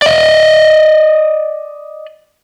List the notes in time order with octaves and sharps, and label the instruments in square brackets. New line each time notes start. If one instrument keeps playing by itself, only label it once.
[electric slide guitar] D5 D#5